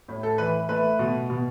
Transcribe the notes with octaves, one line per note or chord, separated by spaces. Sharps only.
A2
A4
E3 B4
A3 B4
B2
B2